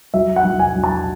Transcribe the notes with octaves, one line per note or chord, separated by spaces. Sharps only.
F#3 E5
F#5
F#3
G#5
F#3
A5